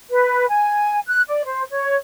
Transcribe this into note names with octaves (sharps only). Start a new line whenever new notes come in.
B4
G#5
F#6
D5
C5
C#5